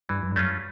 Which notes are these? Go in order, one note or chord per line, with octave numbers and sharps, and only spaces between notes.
G2 E3
F#2
G2
F#2 A3 C#4 F4